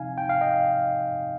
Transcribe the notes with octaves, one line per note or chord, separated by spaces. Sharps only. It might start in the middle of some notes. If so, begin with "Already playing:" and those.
Already playing: C3 F3 C4 D#4 F5 G#5
G5
F5
D#5 G5